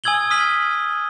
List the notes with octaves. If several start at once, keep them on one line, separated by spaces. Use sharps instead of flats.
G#5 D#6 E6 G#6 F#7 G7
D#6 F6 B6 D#7 F#7